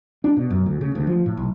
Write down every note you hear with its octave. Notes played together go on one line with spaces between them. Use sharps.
D4
B2
F#2
D2
C#3
D2
F3
A2
B1